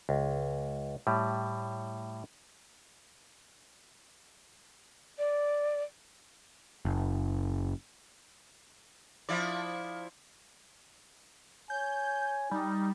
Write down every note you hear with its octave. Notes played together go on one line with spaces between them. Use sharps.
C#2
A2 G3
D5
F#1
F3 E4 D5
C#5 G#5 G6
G3 D#4